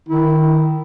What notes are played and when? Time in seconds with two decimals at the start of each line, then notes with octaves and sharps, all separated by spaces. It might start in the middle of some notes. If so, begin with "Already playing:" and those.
0.09 D#3 E4